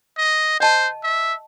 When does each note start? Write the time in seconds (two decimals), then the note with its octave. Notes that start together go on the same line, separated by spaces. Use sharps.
0.17 D#5
0.60 C5 D#5 A5
1.03 E5